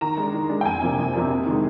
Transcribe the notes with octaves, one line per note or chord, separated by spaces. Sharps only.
D#3 A#5
G#3 D4
D#3
G#3 D4
G5
F2 G#5
C3 F3 A#3 D4
F2
C3 F3 A#3 D4
C3
D#3 G#3